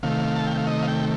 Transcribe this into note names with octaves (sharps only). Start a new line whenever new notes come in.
C3 D#3 A3 F5
A5
G5
F5
D#5
F5
G5